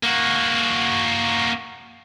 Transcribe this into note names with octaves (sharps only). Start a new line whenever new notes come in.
A#3 F#4